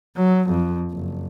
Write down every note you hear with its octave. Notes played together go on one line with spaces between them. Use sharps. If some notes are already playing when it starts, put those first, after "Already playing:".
F#3
F2
F#1